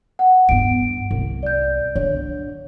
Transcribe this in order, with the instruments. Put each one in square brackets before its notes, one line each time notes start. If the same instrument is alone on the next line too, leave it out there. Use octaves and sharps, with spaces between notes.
[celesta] F#5
[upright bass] G2 B3 [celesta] D7
[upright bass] C2
[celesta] D5 G6
[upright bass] D3 [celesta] C#5